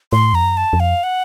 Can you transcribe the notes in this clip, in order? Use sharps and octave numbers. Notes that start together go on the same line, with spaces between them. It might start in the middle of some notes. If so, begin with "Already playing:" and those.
A2 C6
F2 A#5
F#2
A5
F2
F5
F#5